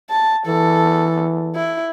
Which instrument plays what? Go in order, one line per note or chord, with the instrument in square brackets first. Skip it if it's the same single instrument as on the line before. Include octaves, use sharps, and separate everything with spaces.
[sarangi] A5
[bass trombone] E3 [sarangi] A4
[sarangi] E4